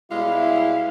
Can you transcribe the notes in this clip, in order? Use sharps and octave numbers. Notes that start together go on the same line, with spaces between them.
B2 G3 G#3 E4 F5